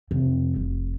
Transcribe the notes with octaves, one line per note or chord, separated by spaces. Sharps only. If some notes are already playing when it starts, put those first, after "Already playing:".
F2 C3
F1